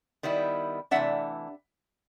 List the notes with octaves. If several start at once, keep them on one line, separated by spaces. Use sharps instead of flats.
D#3 G3 B3 E4
C3 E3 A3 D4 E5 F#5